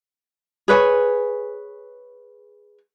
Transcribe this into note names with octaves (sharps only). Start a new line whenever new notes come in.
G#4 B4 C#5 G#5